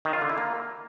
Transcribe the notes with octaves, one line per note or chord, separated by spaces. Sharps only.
D#3
F4
D3
E4
A#3